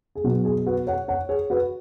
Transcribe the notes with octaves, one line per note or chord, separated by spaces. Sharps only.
G#4
B1 B2 F#3 F#4
G#4
F#4 B4
C#5 F#5
C#5 F#5
G#4 C#5
F#4 B4